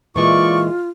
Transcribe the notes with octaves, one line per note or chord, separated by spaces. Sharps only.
A#2 E3 G#3 F4 D5 C#6